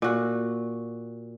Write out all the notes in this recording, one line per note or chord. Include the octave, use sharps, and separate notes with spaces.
A#2 F#4